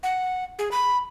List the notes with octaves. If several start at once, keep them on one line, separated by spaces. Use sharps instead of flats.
F#5
G#4
B5